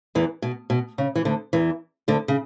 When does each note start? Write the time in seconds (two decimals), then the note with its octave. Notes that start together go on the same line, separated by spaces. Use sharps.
0.15 E2 E3
0.42 B2
0.70 B2
0.98 C#3
1.16 E3
1.25 D2 D3
1.53 E2 E3
2.08 D2 D3
2.28 C#3